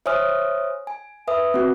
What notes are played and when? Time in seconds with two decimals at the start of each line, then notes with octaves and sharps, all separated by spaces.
0.06 C5 C#5 E5 G#5 D#6 F6
0.87 G#5
1.28 B4 E5 D#6
1.54 C4 F#4